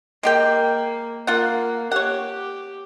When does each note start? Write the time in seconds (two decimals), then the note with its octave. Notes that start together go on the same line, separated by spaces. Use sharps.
0.23 G#3 A#3 G4 G5
1.27 A#3 F4 F#5
1.91 G4 C#5 F#5